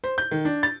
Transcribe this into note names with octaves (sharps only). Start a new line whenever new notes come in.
C5
G6
D#3
D4
A6